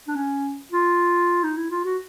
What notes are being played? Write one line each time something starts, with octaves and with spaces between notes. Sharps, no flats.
D4
C#4
F4
D#4
E4
F4
F#4